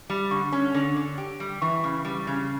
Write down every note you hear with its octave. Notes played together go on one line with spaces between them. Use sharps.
G3
D3 C#6
C#4
D3
D3
G4
G3
E3 C#6
C#3
G3
C#3